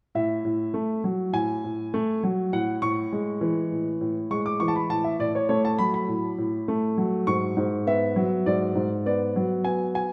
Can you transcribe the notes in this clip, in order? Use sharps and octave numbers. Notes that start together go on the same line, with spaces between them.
A2 E5
A2
A3
F#3
A2 G#5
A2
A3
F#3
A2 F#5
A2 C#6
G#3
E3
A2
A2
G#3 C#6
D6
E3 C#6
A5
B5
A2 A5
E5
A2 D5
C#5
A3 C#5
A5
F#3 B5
B5
A2
A2
A3
F#3
G#2 C#6
G#2
B3 E5
F#3
G#2 D5
G#2
B3 D5
F#3
B3 G#5
G#5